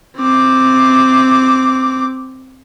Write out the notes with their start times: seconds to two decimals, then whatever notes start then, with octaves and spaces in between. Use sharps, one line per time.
0.18 C4 D6